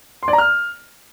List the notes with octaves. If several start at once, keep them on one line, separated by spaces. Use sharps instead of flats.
C6
D5
A#5
F6